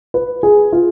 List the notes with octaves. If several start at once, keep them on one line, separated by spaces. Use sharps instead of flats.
B4
G#4
F4